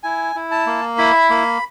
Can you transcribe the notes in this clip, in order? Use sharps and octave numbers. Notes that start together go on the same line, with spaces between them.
E4 G#5
E4
A5
A#3
E4 B5
A#3